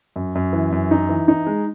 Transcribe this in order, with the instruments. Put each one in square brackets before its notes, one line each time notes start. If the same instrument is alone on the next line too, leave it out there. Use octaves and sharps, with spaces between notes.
[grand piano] F#2
F#2
E3
F#2
D#4
E3
D#4
G#3